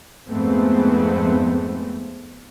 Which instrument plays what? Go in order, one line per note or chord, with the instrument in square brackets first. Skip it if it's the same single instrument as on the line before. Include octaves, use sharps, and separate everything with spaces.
[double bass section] F2 G#2 G#3 A3 B3 C4